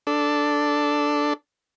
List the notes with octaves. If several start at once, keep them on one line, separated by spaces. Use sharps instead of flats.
D4 A4